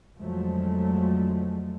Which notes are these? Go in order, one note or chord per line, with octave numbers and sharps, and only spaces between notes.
F2 D3 F3 F#3 G#3 A3